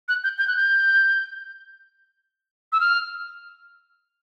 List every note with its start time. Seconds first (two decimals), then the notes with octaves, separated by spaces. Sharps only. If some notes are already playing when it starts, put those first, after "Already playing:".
0.09 F#6
0.24 G6
0.38 G6
0.47 F#6
0.56 G6
2.72 E6
2.80 F6